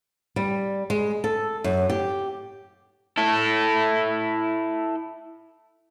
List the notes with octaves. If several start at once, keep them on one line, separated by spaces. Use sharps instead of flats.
G3
G#3
A4
F#2
G4
E4 A4